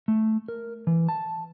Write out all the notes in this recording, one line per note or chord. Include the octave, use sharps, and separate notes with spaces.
A3
A#4
E3
A5